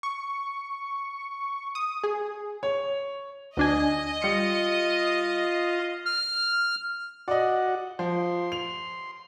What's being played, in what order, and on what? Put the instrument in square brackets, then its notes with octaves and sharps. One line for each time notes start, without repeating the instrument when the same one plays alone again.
[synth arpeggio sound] C#6
D#6
G#4
[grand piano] C#5
[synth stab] D2 D4 G#5 [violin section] D#5
[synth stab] G3 C#7 [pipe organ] F4 F5
[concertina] F6
[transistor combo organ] F#4 F#5 [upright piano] D5 D#5
[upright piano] F3 [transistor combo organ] C6
[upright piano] F7